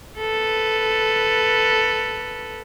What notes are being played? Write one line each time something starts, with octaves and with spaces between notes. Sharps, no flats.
A4 B4